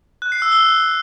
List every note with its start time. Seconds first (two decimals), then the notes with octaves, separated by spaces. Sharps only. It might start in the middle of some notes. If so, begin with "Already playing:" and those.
0.22 F#6
0.32 C7
0.42 E6
0.52 G7